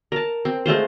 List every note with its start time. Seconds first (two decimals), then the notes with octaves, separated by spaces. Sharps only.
0.12 A#4 A5
0.45 C4
0.66 G#3 A3 F4 C5